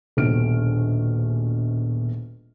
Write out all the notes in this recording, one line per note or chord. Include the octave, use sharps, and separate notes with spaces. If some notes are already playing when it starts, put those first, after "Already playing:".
D#1 A#1 B2 F6 D7